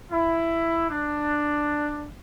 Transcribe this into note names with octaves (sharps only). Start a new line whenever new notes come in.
E4
D4